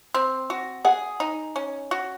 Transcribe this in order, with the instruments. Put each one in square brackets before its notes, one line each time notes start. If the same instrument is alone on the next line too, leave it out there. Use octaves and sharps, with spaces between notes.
[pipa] C4
F#4
[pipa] G#4 [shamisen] F#5
[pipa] D#4
C#4
F#4